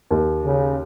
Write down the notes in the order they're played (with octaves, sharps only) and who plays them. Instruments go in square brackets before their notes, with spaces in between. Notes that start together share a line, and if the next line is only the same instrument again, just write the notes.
[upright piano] D#2
[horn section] C#3